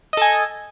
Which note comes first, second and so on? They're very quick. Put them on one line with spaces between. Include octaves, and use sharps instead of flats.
D#5 A4 G#5